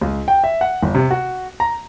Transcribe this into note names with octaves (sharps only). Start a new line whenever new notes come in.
C#2
G5
E5
F#5
G1
C3
F#4
A#5